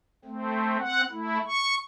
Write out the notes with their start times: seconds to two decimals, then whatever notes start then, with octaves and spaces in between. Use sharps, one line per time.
0.25 A3 C4
0.80 C4 F#5
1.11 A3 E4
1.46 C#6